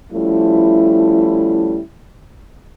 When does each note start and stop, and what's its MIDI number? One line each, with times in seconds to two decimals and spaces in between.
0.13 1.79 53
0.13 1.79 55
0.13 1.79 57
0.13 1.79 61
0.13 1.79 64